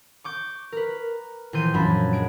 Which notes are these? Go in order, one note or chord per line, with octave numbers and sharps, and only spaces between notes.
C#6 D6 G6
A#4 B4
A#1 E3 C6 G6 D#7
F#2 A#2 F3 D4 B5
G#3 D7